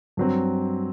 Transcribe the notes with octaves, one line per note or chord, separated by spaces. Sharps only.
G2 F#3 C4